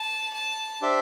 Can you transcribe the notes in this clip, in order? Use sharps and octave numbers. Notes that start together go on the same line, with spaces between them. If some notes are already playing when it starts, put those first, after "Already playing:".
Already playing: A5
A5
D4 G4 C5 E5